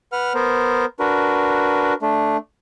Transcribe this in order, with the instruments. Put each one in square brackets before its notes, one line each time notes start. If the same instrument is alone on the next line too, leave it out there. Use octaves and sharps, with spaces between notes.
[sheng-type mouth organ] B4 F#5 F6
B3 A#4 C5
D4 F#4 A#4 B4
A3 D4